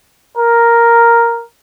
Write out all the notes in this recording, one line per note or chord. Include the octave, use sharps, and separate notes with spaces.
A#4